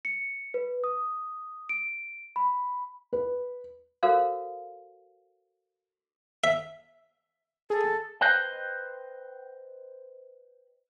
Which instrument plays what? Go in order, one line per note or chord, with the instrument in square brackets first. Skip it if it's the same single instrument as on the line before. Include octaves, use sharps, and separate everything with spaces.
[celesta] C#7
B4
D#6
D7
B5
[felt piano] B4
[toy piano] F#4 A4 A#4 C5 F5
[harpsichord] E5
[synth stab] G#4 [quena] A4
[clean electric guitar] B4 C5 D#5 G5